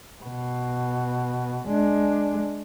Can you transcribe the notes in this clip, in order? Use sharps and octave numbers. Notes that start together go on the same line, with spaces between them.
B2
G#3 D4